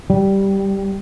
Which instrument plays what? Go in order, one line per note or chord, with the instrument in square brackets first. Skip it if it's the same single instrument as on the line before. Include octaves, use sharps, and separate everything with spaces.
[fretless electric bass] G3